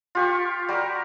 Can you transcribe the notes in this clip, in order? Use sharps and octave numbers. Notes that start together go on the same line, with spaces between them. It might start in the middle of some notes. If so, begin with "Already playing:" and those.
F4 G4 C#6
G3 F#4 G4 A#4